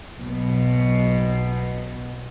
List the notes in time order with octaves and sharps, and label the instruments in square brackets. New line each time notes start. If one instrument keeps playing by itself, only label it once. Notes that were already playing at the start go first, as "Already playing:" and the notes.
[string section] B1 B2